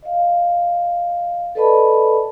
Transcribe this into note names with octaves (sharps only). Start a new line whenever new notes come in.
D#5 F5
A4 B4 D5 D#5 A5 B5